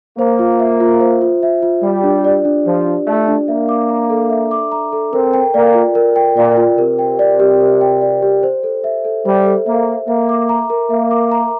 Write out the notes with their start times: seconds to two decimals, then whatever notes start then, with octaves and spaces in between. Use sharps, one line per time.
0.18 A#3 C5
0.39 F4
0.60 E5
0.80 F4
1.00 C5
1.21 F4
1.43 E5
1.62 F4
1.83 G3 G4
2.03 D4
2.24 D5
2.45 D4
2.66 F3 G4
2.86 D4
3.07 A3 D5
3.28 D4
3.48 A#3 E5
3.69 D6
3.89 A#5
4.10 A4
4.30 E5
4.51 D6
4.72 A#5
4.93 A4
5.13 C4 A#4
5.34 G5
5.54 A#3 D5
5.75 F4
5.95 A#4
6.16 G5
6.36 A#2 D5
6.57 F4
6.78 C3 A#4
6.99 G5
7.19 D5
7.40 G4
7.60 A#4
7.81 G5
8.02 D5
8.22 G4
8.43 C5
8.63 A4
8.84 E5
9.05 A4
9.25 G3 C5
9.46 A4
9.66 A#3 E5
9.88 A4
10.07 A#3 E5
10.29 D6
10.49 A#5
10.70 A#4
10.90 A#3 E5
11.11 D6
11.32 A#5